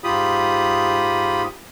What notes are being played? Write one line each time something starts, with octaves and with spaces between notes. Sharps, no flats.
G#2 F4 G4 B5 D#6